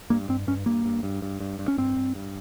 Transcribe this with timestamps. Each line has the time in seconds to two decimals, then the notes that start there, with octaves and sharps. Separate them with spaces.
0.10 G2 A#3
0.29 G2 C4
0.47 G2 C#4
0.66 G2 A#3
0.85 G2
1.03 G2
1.22 G2
1.40 G2
1.59 G2
1.68 C#4
1.78 G2 C4
1.97 G2
2.15 G2